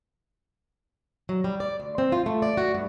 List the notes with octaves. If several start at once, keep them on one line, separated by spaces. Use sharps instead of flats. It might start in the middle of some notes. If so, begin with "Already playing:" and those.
F#3
G3
D5
D2
C4
F4
A3
D5
F#4
G2